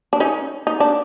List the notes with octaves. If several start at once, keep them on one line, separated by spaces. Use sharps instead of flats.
D4
C#4 D#4
D#4
D4